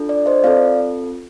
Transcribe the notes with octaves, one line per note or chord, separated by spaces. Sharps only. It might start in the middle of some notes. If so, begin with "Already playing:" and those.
Already playing: D4 F4 A4
D5
C5 D#5
C4 F4 A4 D5 F5